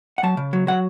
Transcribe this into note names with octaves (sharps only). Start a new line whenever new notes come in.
F#5
F#3 A5
C#3
F#3
F#3 F#5